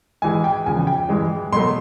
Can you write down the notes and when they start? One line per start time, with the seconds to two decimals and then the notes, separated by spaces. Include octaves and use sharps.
0.22 G#2 E3 G#3 G#5
0.44 G5
0.66 E2 C#3 F3 G#5
0.87 G5
1.09 G2 E3 G#3
1.52 B2 F#3 A3 C6